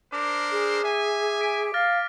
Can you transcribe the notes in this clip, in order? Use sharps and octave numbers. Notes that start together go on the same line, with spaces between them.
D4 A#4 C5 D6
G#4
E5 G#5
B6 D7
F5 F6 A6 A#6